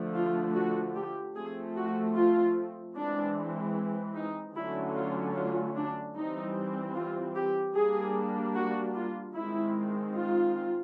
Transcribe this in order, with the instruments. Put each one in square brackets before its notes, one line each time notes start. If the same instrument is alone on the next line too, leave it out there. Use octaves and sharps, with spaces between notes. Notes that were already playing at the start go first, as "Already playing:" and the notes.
Already playing: [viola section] D3 F3 A3
F4
F#4
G4
F3 A3 C4 G#4
F#4
F4
E3 G#3 C4 D4
D#4
D3 F#3 A3 C#4 E4
F4
F4
D4
E3 G3 C4 D#4
F4
G4
G3 A#3 D4 G#4
F#4
F4
D#3 G#3 C4 E4
F4